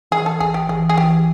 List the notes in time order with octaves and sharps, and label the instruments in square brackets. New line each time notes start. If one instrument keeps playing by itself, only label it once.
[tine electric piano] E3 [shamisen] G#4
[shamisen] A4
[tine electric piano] A1 [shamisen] G#4
[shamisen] G4
[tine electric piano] E3 [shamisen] G#4
[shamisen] G#4
[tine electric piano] E3 [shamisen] G4